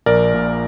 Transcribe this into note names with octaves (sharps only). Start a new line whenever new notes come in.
A#1 A#4 D5
A#2